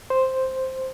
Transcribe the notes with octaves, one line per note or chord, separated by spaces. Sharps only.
C5